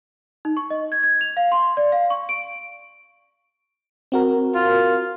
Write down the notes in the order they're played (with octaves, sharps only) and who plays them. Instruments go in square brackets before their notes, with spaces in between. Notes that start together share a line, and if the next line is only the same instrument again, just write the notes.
[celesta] D#4
C#6
D#5
G#6
G#6
F7
F5
C6
D5
F5
C#6
D7
[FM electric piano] C4 F#4 A#4
[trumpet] F4